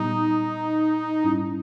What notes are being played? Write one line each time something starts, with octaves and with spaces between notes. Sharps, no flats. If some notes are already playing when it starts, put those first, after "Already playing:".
Already playing: A#2 G3 B3 D#4 G4
G#2 G3 C#4 E4